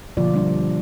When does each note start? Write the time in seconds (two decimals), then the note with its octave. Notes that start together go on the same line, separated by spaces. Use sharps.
0.17 B2 D3 F3 A#3 F4 D5
0.34 G3 D4